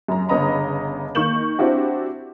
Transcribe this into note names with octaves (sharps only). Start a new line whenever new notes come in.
F#2 A#5
G1 C#3 B3 D#5 A#5 B5
D#3 A#3 C#6 G6 E7 F#7
C4 D4 E4 F#4 G4